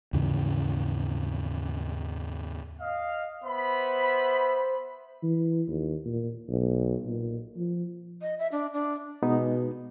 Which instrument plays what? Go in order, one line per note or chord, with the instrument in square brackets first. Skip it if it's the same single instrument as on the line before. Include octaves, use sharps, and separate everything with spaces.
[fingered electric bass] D#2 G#2 C#3 E3
[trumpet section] D#5 F5
[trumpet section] B3 E5 B5 [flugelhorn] C5
[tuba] E3
D#2
A#2
B1
A#2
F3
[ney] D#5
E5
D4
D4
[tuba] B2 [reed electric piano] G#3 B3 D#4